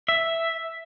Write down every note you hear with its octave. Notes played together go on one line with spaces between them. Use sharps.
E5